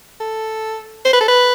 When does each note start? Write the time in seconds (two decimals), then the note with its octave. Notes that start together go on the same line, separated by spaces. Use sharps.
0.20 A4
1.05 C5
1.13 B4
1.21 A4
1.28 B4